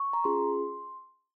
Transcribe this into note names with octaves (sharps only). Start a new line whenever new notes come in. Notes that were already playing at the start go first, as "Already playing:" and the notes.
Already playing: C#6
A#5
C#4 F4 G#4 C6